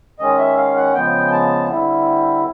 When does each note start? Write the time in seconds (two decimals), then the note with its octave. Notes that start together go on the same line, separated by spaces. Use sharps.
0.19 D#3 G#3 C#4 D#5
0.38 E5
0.57 F5
0.76 F#5
0.94 C#3 F3 G#3 B3 G5
1.32 A5
1.69 D3 G3 C4 E4